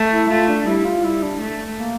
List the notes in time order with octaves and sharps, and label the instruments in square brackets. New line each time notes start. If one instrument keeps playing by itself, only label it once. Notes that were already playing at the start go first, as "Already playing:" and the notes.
Already playing: [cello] A3
[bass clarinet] E4
[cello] A3 [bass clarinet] F4
[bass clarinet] D4
[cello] G3 [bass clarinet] E4
[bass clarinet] F4
[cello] G3 [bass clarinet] E4
[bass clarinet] D4
[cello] A3
[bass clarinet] A#3